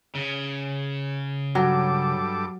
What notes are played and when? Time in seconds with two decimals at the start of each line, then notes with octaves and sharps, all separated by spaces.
0.15 C#3
1.55 G2 F#3 A4 D6